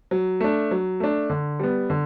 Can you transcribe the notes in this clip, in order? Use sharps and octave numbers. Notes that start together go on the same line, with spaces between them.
F#3
A3 D4
F#3
A3 D4
D3
G3 B3
D3